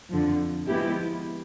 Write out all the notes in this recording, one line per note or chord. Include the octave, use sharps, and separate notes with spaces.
F2 D3 F3
F3 G#3 B3 E4 G4